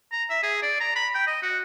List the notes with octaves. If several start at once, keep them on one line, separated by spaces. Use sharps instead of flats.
A#5
E5
G#4
D5
A#5
B5
G5
D#5
F#4